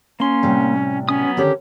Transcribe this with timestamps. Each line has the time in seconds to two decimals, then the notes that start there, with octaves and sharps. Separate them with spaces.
0.20 A#3 C#4 C6
0.43 A2 C3 G3
1.09 F#3 B3 C#4 D#6
1.37 D3 D#3 C#4 G4